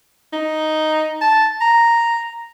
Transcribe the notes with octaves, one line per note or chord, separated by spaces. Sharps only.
D#4
A5
A#5